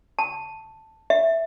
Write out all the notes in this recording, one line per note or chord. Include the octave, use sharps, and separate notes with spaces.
A5
E5